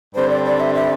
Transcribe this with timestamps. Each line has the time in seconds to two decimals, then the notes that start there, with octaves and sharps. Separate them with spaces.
0.15 G2 D3 G3 C4 C5
0.30 D5
0.45 D5
0.60 E5
0.75 E5